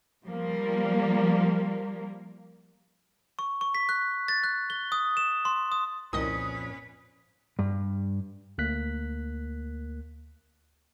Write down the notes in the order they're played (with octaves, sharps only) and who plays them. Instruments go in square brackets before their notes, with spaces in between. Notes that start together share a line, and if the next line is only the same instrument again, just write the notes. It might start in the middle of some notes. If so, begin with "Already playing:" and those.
[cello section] F3 G3 A#3
[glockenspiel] C#6
C#6
B6
F#6
A6
F#6
G7
D#6
E7
C6
D#6
[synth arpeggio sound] C2 D#3 D#5 [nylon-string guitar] F2 A#2 [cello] C#4 B4 [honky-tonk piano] D#6
[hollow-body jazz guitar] G2
[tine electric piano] D2 A#3 F#6 B6